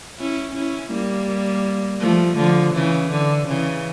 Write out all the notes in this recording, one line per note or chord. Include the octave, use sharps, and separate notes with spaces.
C#4 E4
C#4 E4
G3 A#3
F3 A3
D3 F3
C#3 E3
D3
C#3 E3